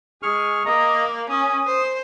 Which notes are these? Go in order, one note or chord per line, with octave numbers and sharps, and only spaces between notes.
G#3 G#4 C#6 F6
A#3 D#5 A#5
C#4 D#6
C5